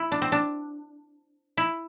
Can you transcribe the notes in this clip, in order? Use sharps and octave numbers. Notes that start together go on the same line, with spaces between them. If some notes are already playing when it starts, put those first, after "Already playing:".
Already playing: E4
D4
C4
D4
E4